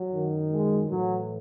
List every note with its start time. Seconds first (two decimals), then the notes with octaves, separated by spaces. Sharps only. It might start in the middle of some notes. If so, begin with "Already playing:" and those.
Already playing: F#3
0.11 F#2 D#3
0.50 G#3
0.89 A2 E3 F#3